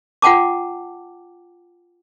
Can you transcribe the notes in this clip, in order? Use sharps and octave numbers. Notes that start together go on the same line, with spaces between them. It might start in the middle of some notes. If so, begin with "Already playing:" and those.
F4 F#5 G5 A5 D6